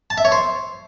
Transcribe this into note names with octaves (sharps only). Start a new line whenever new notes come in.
A5
E5
C#5
C5